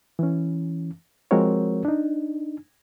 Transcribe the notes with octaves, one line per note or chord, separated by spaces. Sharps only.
E3 C#4
F3 G#3 C4 F#4 A#4 C#5
D4 D#4